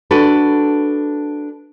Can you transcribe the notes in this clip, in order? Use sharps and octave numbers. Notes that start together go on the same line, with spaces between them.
D4 F#4 A4 B4